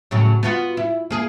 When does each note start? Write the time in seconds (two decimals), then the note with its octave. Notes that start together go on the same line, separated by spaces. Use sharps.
0.11 A2 C#3 F#3
0.43 B3 F4 F#4
0.77 E4
1.10 A#3 G#4